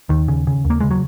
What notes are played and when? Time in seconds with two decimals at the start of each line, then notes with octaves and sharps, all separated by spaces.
0.09 D#2 D#3
0.28 C#3
0.47 C#3
0.65 D#2
0.70 A#3
0.80 C#3 G#3
0.91 F#3